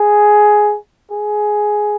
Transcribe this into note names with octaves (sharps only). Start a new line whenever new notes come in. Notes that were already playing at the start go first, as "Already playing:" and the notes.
Already playing: G#4
G#4